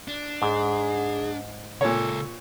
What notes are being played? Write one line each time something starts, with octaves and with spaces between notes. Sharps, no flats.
D4
G#2 G#4
C#2 A#2 A4 C#5 A5